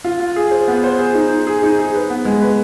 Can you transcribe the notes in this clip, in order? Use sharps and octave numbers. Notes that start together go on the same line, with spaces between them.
F4
F4
G#4
C5
B3
C5
G#4
D#4
D#4
G#4
D#4
G#4
B4
B3
G#3
B4